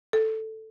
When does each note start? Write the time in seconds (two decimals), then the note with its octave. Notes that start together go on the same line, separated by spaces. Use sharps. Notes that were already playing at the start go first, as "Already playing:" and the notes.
0.13 A4